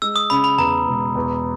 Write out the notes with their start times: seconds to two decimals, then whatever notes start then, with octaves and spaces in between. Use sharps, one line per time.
0.02 G#3 E6
0.16 D#6
0.30 C#3 B5
0.44 B5
0.58 E2 A#5
0.87 E1
1.15 E2